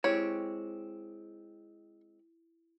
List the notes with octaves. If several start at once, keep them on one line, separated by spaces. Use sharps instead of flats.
G#3 C4 E4 G4 C#5